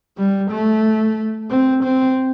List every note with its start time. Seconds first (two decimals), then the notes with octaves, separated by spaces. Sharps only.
0.18 G3
0.51 A3
1.50 C4
1.84 C4